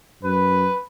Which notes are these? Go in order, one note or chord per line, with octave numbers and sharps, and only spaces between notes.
F#2 B4